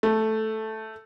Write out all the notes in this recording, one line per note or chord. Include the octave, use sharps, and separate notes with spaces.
A3